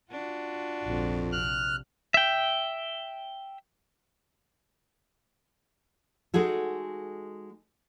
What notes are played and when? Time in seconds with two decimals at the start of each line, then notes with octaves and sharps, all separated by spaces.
0.11 D4 F4 F#4
0.83 A#1 F2 G#2
1.32 C3 F6 F#6
2.14 E5 G5
6.34 G#3 D#4 F#4 G#4 A4